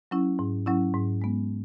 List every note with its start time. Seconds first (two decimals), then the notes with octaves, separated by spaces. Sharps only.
0.11 F#3 C#4 E4
0.39 G#2
0.66 F#3 C#4 E4
0.94 G#2
1.22 G#3 B3